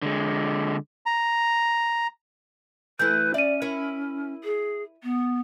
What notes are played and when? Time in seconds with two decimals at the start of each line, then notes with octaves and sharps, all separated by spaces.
0.02 D3 G#3
1.06 A#5
2.99 E3 A3 E4 B4 G6
3.34 C#4 D5 E5 D#7
3.62 E4 A#4 C#5
4.43 G#4
5.03 B3